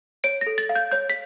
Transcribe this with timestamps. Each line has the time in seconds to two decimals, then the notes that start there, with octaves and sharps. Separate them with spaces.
0.24 C#5 D7
0.41 A#6
0.47 A4
0.58 A6
0.69 F5
0.75 G6
0.91 C#5 G6
1.10 B6